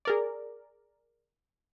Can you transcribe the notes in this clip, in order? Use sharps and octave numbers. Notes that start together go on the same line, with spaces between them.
G#4 A#4 D5